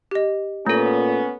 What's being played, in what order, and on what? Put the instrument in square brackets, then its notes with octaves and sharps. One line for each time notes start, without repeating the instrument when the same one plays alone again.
[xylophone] G4 D#5
[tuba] A#2 [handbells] A3 A4 [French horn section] B3 C#4